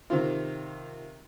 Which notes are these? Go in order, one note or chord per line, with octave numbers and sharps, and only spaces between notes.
C3 D#3 C4 F4